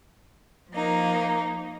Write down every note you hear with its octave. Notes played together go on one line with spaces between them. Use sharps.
F3 A#3 D#4